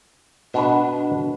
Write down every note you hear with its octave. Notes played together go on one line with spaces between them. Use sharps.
B2 D4 B4